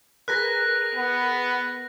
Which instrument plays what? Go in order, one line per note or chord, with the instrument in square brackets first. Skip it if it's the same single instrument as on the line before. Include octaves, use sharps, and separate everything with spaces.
[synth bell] G#4 A#4 B4 [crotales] F#6 A#6 B6
[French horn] B3